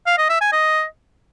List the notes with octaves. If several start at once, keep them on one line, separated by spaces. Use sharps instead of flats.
F5
D#5
E5
G#5
D#5